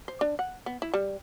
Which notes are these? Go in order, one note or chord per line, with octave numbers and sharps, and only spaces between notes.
C5
D4
F#5
B3
E4
G3